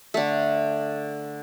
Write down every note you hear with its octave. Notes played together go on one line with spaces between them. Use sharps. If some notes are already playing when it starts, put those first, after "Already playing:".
D3 A3